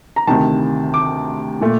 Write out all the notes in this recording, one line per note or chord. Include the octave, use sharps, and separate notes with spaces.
A#5
D2 C3 D#3 A5
D6
A#2 A3